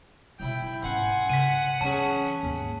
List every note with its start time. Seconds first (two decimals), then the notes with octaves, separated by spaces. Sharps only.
0.40 B2 F#3 E4 G5
0.83 G#2 C#4 F#5 G#5 C6
1.29 C#3 B6 D#7
1.81 E3 F#3 C#4 G#4 A5
2.43 D#2 G#2